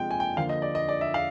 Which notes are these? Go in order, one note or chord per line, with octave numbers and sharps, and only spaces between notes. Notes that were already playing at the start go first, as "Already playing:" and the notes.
Already playing: C3 F3 G#3 G5
G#5
G5
D3 F3 A#3 F5
D#5
D5
D#5
D5
E5
F5